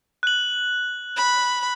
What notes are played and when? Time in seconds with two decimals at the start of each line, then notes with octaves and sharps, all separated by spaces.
0.23 F#6 F#7
1.16 B5